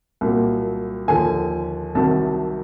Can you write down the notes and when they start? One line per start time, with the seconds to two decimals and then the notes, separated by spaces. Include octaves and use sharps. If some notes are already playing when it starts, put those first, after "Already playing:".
0.21 C2 A#2 F#3
1.08 D#2 D3 F3 G#5
1.95 C2 C3 D#3 F#3 A5